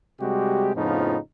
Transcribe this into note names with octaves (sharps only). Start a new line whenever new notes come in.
C3 G3 G#3 F#4 G4
F2 A2 C#3 F3 B3 D#4